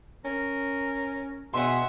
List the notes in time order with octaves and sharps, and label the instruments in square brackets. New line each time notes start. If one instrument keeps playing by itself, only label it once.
[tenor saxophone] C#4 [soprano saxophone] A#4
[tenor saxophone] B2 [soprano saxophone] G#4 [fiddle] E5 F#5 [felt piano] C6